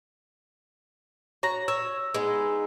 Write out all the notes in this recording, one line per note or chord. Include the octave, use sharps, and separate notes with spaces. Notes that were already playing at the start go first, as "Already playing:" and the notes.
F#4 C#5 A#5 A#6
C#5 E6
G#3 B3 D#4